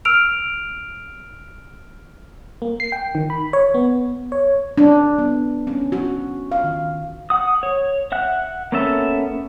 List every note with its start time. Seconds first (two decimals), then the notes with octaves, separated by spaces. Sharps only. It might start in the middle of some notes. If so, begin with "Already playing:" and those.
0.05 E6 F6 D7 F7
2.62 A#3
2.80 C7
2.92 G5
3.15 D#3
3.30 B5
3.53 C#5
3.74 B3
4.32 C#5
4.78 D4
5.18 B3
5.67 C#4
5.92 F#4
6.52 F5
6.64 D#3
7.30 F#5 D#6
7.63 C#5
8.12 E5 F#5 F#6
8.72 A#3 B3 C#4 A4 E5